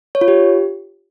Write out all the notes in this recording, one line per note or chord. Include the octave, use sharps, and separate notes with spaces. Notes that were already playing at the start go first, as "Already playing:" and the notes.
C#5
F4
G4